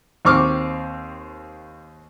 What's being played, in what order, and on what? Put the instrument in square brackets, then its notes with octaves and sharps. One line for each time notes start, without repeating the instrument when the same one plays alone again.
[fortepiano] D#2 C4 C#6 D6 F6